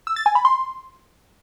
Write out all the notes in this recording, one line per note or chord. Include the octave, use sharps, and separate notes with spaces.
E6
A6
G#5
B5
C6